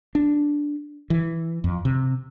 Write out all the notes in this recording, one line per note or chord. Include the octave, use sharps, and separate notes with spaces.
D4
E3
F2
C3